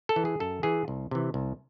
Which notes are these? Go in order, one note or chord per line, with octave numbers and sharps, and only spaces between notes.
A4
E3
G#4
F#2 A4
E3 G#4
C2
C3 E3
C2